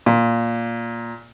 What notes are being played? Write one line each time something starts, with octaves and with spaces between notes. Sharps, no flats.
A#2